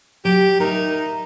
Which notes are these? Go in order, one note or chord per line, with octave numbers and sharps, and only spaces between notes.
F#3 G4
D#4 A#4 E5